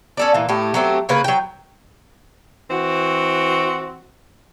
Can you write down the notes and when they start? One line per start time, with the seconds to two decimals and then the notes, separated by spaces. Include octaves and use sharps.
0.17 C#4 A4 D5
0.34 A#2 E3
0.49 A2 A3 G4
0.74 F#3 A3 C4 G4
1.09 C#3 A#3 B4
1.24 F#3 G5
2.71 E3 C4 F#4